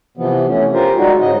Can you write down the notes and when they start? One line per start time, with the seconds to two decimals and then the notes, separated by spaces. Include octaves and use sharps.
0.17 C3 E3 F3 B3
0.47 A3 C#4
0.74 F4 G4 A#4 C5
0.97 G3 G#3 D#4 F#4
1.21 G#2 C#3 D#5